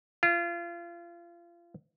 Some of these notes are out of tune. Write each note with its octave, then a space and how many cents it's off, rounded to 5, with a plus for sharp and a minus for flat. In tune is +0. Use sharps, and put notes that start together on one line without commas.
F4 -30